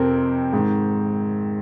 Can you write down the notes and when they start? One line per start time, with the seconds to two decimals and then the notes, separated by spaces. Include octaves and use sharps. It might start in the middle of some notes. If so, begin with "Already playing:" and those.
Already playing: F2 C3 C4 A#4
0.53 G#2 D#3